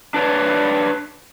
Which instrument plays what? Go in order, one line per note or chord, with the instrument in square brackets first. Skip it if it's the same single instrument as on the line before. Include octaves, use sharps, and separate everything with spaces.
[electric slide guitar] D4 B4 C#5 D5